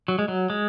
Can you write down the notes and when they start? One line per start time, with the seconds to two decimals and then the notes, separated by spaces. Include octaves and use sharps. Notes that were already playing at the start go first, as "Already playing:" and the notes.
0.08 F#3
0.19 G#3
0.28 F#3
0.50 G#3